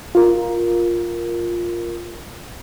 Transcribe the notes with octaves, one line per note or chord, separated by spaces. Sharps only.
F4 A#4